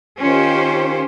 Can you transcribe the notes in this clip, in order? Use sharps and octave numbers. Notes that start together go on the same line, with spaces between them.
D#3 C#4 F4 G4 C5